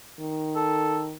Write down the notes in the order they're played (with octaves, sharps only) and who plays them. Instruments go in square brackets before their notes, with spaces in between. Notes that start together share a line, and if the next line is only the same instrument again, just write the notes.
[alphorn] D#3
[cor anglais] A4